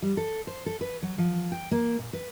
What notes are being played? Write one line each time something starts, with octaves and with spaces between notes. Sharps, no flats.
G3
A4
C5
A4
B4
F#3
F3
G5
A#3
A#2
B4